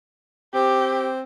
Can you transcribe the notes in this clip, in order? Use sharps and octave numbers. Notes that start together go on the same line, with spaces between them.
C4 G4